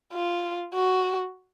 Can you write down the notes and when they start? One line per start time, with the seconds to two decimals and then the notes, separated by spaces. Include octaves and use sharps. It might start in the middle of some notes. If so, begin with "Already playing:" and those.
0.13 F4
0.74 F#4